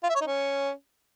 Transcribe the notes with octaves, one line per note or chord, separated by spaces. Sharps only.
F4
E5
C#5
D#4
C#4